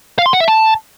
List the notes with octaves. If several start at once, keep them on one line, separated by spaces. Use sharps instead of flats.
F5
C6
F#5
E5
A5